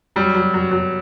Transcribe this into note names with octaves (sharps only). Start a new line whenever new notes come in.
F#3 G3
F#3
F#3
F#3